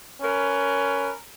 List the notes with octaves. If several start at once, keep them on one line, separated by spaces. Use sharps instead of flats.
C#4 A#4 B4